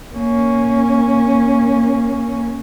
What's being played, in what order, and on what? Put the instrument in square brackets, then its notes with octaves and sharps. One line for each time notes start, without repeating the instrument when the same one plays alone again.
[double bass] A#3 C#4